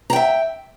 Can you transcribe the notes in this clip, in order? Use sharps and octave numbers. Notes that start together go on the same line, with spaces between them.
E5 G5 A#5